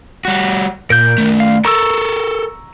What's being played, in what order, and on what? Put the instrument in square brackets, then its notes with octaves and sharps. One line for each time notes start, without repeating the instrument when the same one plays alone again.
[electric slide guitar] G3 F#4
[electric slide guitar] A#2 [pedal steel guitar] A#4 G6
[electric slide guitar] D#3 A3
[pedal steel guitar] F5
[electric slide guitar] A4 A#4 [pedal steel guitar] A#5 C#6 E6